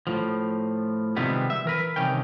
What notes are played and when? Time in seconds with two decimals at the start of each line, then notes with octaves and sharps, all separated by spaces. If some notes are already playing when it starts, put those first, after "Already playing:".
0.07 A2 F3
1.17 C3 D#3 F3 G3 G#3 B3
1.50 E5
1.65 E3 A#4 B4
1.96 C2 C3 D#3 C#4 G5